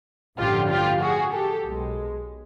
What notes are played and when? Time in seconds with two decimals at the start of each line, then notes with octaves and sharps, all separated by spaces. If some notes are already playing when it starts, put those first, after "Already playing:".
0.39 A1 G2 D3 F3 F4 G4
0.70 F4 G4
1.02 F#4 G#4
1.33 G4 A4
1.65 B1 B2 G#3